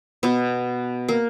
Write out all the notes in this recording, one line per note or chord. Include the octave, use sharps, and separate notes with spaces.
B2 B3
A#3